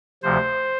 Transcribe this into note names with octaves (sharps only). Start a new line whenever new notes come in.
D2 C3 F3 C5